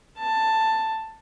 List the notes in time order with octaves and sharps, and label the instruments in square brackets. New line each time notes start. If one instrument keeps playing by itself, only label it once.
[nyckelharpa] A5